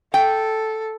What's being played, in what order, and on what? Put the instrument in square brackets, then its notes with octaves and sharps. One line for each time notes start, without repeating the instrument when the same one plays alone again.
[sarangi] A4 [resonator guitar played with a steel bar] G5